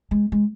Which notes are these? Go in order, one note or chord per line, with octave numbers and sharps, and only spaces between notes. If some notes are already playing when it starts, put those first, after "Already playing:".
G#3
G#3